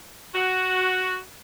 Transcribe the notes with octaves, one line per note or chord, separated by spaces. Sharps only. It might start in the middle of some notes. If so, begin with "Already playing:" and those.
F#4